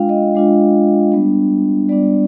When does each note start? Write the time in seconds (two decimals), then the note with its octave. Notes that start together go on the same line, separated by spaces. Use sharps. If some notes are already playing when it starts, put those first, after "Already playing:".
Already playing: G#3 D4 F4 F5 G5
0.09 D#5
0.35 G#3 D4 F4
1.12 G3 B3 D4
1.89 G3 B3 D4 D5